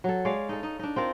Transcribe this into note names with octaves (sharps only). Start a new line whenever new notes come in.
F#3 A4
G#3 C#5 D5 F5
D#4 A4
D#4
D4 D#4
C4 F4 A#4